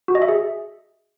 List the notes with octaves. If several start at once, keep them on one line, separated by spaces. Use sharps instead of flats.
F#4
D#5
E5
G#4